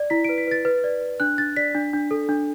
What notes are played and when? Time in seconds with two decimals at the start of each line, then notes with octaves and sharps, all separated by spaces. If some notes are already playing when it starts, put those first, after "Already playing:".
Already playing: D5
0.10 E4 B6
0.25 D7
0.29 B4
0.38 B6
0.47 B4 A6
0.65 B4
0.84 D5
1.01 B4
1.20 D4 F#6
1.38 D4 A6
1.57 D5 B6
1.75 D4
1.93 D4
2.11 A4
2.29 D4